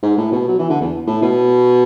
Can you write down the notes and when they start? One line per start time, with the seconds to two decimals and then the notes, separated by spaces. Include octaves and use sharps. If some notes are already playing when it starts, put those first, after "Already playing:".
0.03 G#2
0.17 A2
0.32 B2
0.48 F#3
0.59 E3
0.70 D3
0.81 E2
1.07 A2
1.22 B2